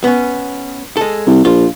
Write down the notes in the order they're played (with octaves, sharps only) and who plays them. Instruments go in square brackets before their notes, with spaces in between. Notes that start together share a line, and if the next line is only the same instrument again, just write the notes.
[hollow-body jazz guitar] B3 C#4
G#3 A4
[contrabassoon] C2
[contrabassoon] A#1 [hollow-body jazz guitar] F4